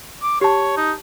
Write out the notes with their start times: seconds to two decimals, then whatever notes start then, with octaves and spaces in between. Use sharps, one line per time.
0.22 D6
0.41 G4 C#5 A5
0.77 D#4